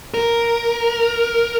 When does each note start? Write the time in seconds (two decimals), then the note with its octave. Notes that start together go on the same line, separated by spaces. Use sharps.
0.14 A#4